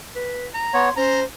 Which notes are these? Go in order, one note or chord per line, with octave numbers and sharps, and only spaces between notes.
B4
A#5
B3 C#5 C6
C#4 C5 A#5